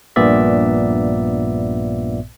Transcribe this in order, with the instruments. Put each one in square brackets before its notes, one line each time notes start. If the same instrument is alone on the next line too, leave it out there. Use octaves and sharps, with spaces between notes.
[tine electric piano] A#1 G2 A#2 B3 D5 E5